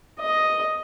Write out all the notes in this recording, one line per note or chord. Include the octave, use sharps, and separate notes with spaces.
D#5